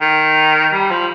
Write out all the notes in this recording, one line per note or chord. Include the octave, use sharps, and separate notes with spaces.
D#3
G3
F3